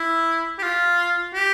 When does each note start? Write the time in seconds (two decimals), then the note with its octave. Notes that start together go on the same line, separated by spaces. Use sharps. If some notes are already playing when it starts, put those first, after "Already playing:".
Already playing: E4
0.58 G4
0.63 F4
1.34 G4